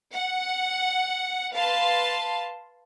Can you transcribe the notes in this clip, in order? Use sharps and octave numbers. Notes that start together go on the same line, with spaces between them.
F#5
B4 F5 A5 C6